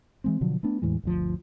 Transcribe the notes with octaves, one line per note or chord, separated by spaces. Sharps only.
E3 G#3 C4
B2 D3 F3 F#3
A3 B3 D4
E2 A2 E3 G#3
G1 D2 F3